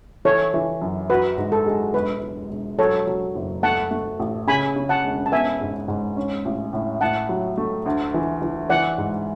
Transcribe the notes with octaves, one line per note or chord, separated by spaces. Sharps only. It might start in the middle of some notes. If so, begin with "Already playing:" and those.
E3 A4 C#5
E3
F#2
F#4 B4
G#2
A4
G#3
E1 B4
E1
E1
F#3 A4 C#5
F#3
F#1
A3 F#5 A5
A3
A1
C#3 G#5 B5
C#3
F#5 A5
E1
A5
B3 E5 G#5
G#2
G#2
C#4
A1
A2
A2 F#5 A5
F#3
A3
D2
E3
E3
E3 D5 F#5
G#2